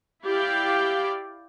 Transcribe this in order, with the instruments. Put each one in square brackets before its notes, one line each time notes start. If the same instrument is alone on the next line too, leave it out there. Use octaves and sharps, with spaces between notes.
[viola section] E4 G4 D5 F5 G5